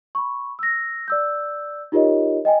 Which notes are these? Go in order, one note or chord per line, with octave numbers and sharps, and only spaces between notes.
B5 C#6
E6 A#6
D5 E6 G6
D#4 F4 G4 A#4 C#5 D#5
D#5 G5 G#5